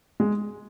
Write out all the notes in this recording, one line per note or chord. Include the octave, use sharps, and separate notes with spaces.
G#3